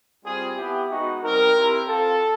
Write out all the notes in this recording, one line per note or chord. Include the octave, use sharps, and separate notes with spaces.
G3 C4 F4 G#4
B3 E4 G4
G#3 B3 D#4 F#4
G3 C4 D#4 A#4
C4 E4 G4
C4 F4 A4